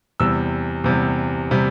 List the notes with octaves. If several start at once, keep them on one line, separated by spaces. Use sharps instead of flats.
E2 C3 G3 E6
E2 C3 G3
C3 G3